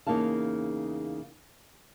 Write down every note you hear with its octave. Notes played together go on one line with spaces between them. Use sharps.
E2 C#3 A#3 D#4 F5 A5